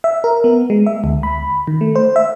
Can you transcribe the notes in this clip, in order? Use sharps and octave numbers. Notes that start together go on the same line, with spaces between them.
E5
A#4
B3
G#3
E5
D2
B5
D#3
A3
C5
E5